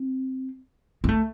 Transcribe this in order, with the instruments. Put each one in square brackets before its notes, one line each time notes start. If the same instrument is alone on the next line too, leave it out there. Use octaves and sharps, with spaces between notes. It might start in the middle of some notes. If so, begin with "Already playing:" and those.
Already playing: [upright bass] C4
C4
A3